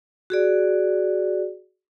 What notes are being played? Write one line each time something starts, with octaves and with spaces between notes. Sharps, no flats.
F#4 G#4 D5